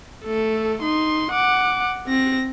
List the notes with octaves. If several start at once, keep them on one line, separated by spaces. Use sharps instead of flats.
A3 A4
D#4 C6
F#5 D6
C4 A#6